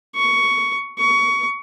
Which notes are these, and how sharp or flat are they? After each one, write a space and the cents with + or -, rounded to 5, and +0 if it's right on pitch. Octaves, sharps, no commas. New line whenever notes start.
C#6 +10
C#6 +20